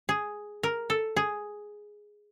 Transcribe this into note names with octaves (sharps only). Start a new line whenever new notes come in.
G#4
A#4
A4
G#4